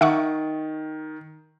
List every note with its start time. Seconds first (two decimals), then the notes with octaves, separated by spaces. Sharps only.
0.01 D#3 E5 F#5 C#6